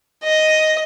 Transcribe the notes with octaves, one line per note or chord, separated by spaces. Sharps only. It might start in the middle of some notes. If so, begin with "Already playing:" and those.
D#5